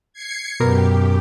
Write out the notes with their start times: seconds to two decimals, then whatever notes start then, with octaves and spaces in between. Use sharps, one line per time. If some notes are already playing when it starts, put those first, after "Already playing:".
0.13 G#6 C7 C#7
0.60 F#2 B2 G4 A#4